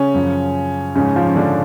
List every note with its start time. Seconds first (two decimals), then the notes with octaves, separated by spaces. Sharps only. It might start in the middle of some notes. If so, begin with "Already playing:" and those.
Already playing: C#3 C#4
0.14 F#2 F3
0.95 G#2 C#3 F3 C#4
1.16 F3 F4
1.28 C#4
1.36 D3 D4